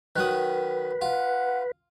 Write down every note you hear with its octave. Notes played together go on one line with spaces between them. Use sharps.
D#3 F#3 B4 D#6
F4 F#5